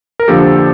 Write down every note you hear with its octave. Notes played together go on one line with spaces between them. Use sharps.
A#4
F2 D3 F3 A#3 D4 G4 A4